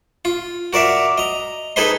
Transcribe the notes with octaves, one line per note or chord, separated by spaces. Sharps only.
F4
F#4 A#4 D5 E5 F5
D#5 A#5
D#4 G#4 A4 B4 D#5 C6